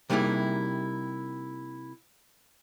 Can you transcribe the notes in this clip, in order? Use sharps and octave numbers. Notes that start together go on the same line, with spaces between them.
C3 G3 A#3 D#4 E4 G#4